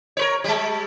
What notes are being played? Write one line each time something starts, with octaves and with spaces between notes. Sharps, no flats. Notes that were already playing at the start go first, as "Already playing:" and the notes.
A#4 B4 C#5
G3 G#3